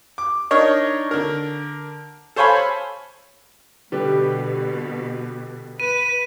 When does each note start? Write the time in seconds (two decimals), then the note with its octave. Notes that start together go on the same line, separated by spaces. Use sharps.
0.18 D6
0.51 D4 D#4 A#4 C#5 D#5
1.11 D3 A#4
2.36 A4 C5 C#5 F5 G#5 B5
3.92 B2 D3 G3 G4 B4
5.80 B4 D#7